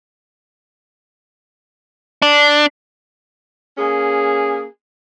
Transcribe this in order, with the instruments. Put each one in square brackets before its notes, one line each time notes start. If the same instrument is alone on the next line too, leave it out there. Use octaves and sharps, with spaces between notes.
[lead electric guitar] D4
[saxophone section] A#3 C#4 G#4